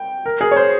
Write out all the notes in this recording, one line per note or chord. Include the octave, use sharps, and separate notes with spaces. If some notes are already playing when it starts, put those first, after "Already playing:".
Already playing: G5
A#4
G#4
C#5
C5